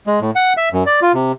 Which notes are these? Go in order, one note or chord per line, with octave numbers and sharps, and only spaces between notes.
G#3
A2
F#5
E5
F#2
D5
F4
C3